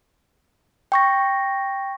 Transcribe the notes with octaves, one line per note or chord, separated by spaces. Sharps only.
G5 C#6 A#6